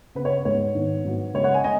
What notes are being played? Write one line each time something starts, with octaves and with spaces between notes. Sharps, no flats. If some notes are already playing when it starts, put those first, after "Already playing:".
C#3 B3 B4
C#5
G#2 G#3 B3 C#5
G#2 D#3 B3
G#2 F#3 B3
C#3 G#3 C#4 C#5
C#5 F#5
D#5 G#5
G#3 D#5 G#5